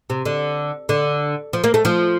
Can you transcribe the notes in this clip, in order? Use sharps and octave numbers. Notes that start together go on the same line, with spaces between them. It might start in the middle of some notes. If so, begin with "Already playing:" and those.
C3
D3
D3
F3
A#3
A3
F3